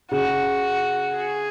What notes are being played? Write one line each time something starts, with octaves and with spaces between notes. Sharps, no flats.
C#3 F#4
G#4